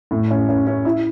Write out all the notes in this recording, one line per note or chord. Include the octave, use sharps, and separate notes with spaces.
A2
C#4
C#4
C#4
E4